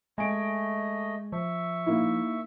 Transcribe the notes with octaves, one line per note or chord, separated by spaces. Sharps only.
G#3 A3 D#5 G#5 D7
F3 E5 C#6
A#3 D#4 E4